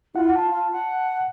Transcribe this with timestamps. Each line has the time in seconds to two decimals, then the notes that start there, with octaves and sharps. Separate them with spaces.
0.15 E4 F4 F#5
0.35 A5
0.50 F4
0.72 F#5